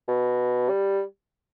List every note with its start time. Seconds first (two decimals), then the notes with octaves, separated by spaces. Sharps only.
0.08 B2
0.69 G3